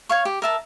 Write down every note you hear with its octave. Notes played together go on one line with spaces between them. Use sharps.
C#5 F5 C#6
G4
A#4 E5 A5